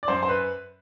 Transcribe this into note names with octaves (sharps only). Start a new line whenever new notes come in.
D5
F#2 C5
C5
B4